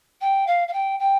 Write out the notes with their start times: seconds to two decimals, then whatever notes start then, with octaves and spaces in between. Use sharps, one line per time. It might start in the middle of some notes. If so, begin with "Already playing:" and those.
0.21 G5
0.47 F5
0.68 F5
0.73 G5
0.99 G5